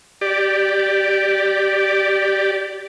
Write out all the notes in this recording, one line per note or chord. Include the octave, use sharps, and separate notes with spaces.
G4 D5